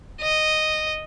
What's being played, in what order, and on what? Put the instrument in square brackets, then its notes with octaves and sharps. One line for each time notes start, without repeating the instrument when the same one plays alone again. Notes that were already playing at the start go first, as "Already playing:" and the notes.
[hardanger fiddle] D#5